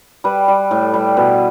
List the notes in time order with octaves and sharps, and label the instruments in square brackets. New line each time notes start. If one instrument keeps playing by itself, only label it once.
[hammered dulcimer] G3 B4
G3
A2
G3
B2 B4